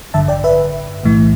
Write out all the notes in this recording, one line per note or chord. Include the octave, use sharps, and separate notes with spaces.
A1 G2 D3 E5 A5
D5 G5
B4 E5
B1 A2 E3